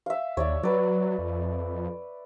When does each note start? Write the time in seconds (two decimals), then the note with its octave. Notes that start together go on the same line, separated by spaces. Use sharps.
0.06 E5 F5
0.37 D#2 C#5 D5 E5
0.63 F#3 B4 D5
1.19 F2